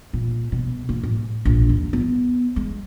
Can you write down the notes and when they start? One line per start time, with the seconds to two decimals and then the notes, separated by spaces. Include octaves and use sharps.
0.13 A#2
0.52 B2
0.89 A#3
1.03 A2
1.45 A#1
1.69 D#2
1.93 B3
2.56 G#3